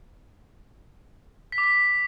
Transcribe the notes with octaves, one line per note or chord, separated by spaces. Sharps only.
B6
D6
B6